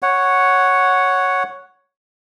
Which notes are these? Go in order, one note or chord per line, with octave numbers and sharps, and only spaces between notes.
C#5 F#5